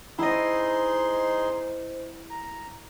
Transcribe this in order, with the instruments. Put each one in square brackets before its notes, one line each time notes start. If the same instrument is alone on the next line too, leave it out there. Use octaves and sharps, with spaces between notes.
[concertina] D#4 G#4 C6 [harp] E4 D#5 [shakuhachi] C5
[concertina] A#5